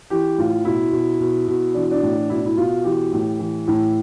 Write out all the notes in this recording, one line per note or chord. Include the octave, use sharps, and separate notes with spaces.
E3 G4
A2 F4
B2 E4
B2
B2
B2
E3 D4
D4
A2
B2 E4
D4
E4
B2 F4
E3 G4
A2
E3
A2